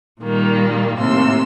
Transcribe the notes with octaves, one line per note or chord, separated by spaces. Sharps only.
A#2 D#3 G3 A#3
D#2 A2 C3 C6 E6